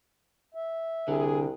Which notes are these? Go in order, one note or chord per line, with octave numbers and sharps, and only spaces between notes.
E5
C2 D3 G#4